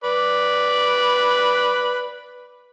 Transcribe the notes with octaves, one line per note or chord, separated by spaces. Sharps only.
B4 D5